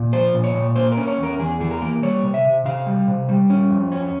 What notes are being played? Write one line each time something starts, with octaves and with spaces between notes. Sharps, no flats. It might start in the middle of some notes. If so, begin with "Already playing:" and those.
Already playing: A#2
F3 C5
A#2
C#5
A#2
A#3 C5
A#4
C#4
C#5
E2
A#4
E2 G#4
E3 G#4
A#4
A#3
G3 C#5
C3
E5
C3
C3 F5
G3
C3
G3
C#4
F2
C#4